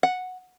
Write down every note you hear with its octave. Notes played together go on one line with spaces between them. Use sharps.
F#5